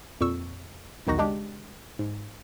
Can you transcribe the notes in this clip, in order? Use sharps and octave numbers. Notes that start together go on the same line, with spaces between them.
F2 A#2 C#6 E6
B1 E2 D#3 D#4 F#4 A#6
C#3 G#3 D4 G4
G#2